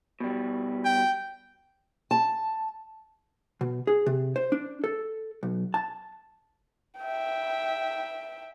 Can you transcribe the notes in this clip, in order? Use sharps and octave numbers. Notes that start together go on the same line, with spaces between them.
B2 G3
G5
A5
B2
G#4
C3
C5
D4
A4
B1
A5
E5 G5